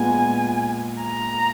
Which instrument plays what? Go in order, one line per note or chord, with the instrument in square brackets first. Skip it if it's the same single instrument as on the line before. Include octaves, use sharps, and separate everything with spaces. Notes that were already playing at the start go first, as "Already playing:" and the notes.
Already playing: [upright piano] A#2 G#3 B3 F4 [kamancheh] G#5
[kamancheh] A#5